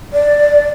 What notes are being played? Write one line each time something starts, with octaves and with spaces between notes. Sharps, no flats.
D5